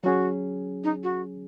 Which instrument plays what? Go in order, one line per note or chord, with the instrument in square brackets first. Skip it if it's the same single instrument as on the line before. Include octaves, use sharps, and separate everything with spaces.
[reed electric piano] F#3 C#4 G#4 [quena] F#4
[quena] D#4
F#4